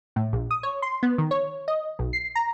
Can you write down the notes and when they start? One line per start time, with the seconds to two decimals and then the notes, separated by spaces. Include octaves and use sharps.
0.16 A2
0.33 A#1
0.51 D#6
0.63 C#5
0.82 C6
1.03 B3
1.18 D#3
1.31 C#5
1.68 D#5
1.99 B1
2.13 C7
2.35 A#5